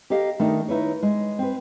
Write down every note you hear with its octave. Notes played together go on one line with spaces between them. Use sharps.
G4 A4 A#4 D#5 F5
D#3 A3 D4 D#4
D#4 E4 B4 C#5
G#3
C4 B4